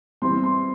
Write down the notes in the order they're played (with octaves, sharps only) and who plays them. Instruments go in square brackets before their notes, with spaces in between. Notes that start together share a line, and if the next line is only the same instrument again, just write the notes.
[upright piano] E3 G3 C4 E4 C6
C6